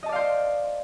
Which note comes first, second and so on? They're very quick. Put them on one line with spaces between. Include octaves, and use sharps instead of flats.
D#5 A5 D5 F5 C5